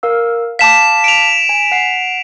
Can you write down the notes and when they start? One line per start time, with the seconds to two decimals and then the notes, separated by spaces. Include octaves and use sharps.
0.03 A#4 F5 E6
0.59 F5 A5 D6 B6 E7
1.04 D7 F7
1.49 G#5
1.72 F#5 C7